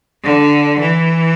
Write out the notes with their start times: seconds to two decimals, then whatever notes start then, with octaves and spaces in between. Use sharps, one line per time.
0.24 D3
0.79 E3